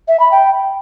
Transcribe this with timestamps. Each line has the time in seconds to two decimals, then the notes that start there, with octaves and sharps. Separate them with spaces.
0.08 E5
0.20 B5
0.31 G5